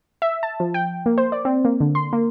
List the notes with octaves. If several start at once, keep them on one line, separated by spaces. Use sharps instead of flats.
E5
A5
F3
G5
A#3
C5
D5
C4
A#3
D3
C6
A#3